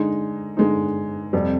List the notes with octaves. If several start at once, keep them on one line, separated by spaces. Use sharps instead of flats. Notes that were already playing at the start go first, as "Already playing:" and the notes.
Already playing: D3 G#3 D#4
D3 G#3 D#4
F2 C3 G3